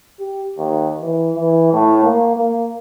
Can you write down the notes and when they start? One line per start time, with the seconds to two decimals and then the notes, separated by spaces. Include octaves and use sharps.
0.19 G4
0.58 D#2
1.01 E3
1.35 E3
1.73 A2
2.03 A#3
2.36 A#3